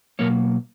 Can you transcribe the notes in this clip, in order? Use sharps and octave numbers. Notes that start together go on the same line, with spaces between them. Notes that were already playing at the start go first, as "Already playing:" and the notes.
B2 F#3 A#3 A#4 C#5